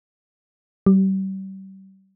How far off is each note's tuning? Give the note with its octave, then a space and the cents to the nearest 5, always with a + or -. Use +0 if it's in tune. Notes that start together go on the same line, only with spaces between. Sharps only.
G3 -35